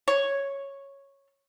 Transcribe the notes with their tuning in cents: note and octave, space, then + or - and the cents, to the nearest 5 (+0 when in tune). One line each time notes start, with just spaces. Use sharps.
C#5 -5